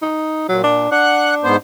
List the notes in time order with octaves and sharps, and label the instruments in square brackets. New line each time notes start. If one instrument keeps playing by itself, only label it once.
[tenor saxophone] D#4
[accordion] A#2 [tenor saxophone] F#3
[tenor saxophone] D4
[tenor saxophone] D4 [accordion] F#5 F#6
[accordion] G#2 B3 C5